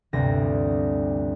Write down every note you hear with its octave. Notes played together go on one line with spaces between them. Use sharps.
G1 D2 C3 A#6